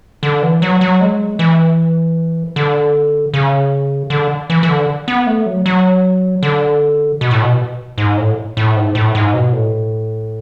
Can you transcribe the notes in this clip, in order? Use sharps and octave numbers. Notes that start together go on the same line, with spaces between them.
D3
E3
F#3
F#3
G#3
E3
D3
C#3
D3
E3
E3
D3
B3
A3
F#3
F#3
D3
B2
A2
B2
G#2
A2
A2
G#2
A2
G#2
B2
A2